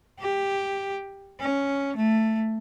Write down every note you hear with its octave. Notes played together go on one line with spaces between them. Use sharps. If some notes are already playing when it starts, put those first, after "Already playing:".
G4
C#4
A3